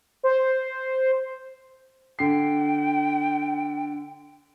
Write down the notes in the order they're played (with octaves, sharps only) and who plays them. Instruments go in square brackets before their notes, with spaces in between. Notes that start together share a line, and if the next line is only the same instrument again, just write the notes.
[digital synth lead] C5
[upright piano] D3 C7 [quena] G5